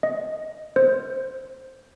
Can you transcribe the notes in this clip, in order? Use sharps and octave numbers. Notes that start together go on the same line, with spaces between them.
D#5
C5